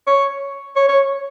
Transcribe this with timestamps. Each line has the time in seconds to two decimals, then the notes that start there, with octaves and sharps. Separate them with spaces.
0.07 C#5
0.76 C#5
0.88 C#5